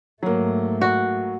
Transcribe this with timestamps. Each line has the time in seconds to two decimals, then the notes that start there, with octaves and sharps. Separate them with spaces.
0.23 G#2 F#3 A3 A#3
0.81 F#4